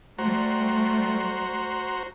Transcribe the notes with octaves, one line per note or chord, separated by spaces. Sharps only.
G3 A3 F#4 C5 A#5